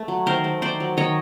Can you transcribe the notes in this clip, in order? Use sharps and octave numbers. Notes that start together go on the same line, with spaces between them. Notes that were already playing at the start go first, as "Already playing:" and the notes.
Already playing: A3
F#3
D#3 A#4 C5
A3
D#3 C5 D5
F#3
D#3 C#5 D#5